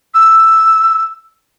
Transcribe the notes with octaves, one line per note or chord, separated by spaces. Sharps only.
E6